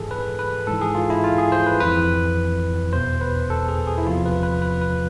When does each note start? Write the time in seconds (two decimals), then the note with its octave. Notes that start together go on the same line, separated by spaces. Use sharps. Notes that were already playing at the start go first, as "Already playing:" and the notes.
Already playing: G#2 E3 G#4 A4
0.11 B4
0.39 B4
0.67 G#2 E3 A4
0.82 G#4
0.95 F4
1.10 E4
1.24 F4
1.38 G#4
1.52 C5
1.66 B4
1.80 F2 E3 B4
2.93 E2 B2 C5
3.21 B4
3.50 A4
3.69 G#4
3.87 G#4
3.98 E4
4.07 E2 C3 F3 F4
4.26 B4
4.43 B4
4.62 B4
4.81 B4